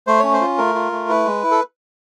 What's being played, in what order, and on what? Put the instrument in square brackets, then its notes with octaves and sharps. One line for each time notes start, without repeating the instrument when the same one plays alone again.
[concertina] A3 C5
C#4 C#5
C5
F4
A3 A#4
F4
A3
E4 B4
G#3
E4
A4